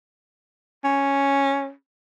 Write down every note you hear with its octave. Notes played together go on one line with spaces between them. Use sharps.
C#4